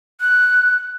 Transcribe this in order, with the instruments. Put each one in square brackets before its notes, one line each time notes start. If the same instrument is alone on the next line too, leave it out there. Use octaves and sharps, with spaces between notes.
[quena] F#6